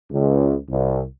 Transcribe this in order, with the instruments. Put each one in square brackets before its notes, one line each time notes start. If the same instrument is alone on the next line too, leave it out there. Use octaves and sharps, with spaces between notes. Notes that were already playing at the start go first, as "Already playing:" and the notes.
[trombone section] C#2
C2